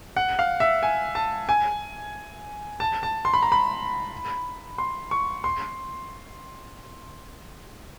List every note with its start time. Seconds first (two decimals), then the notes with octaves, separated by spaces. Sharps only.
0.16 F#5
0.39 F5
0.60 E5
0.83 G#5
1.15 A5
1.49 G#5
2.80 A5
3.03 A5
3.25 C6
3.34 B5
3.42 A#5
3.52 B5
4.78 C6
5.11 C#6
5.44 C6